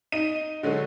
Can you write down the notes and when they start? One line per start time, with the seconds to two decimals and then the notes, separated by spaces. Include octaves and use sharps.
0.12 D#4 D#7
0.63 D3 F#3 G#3 A3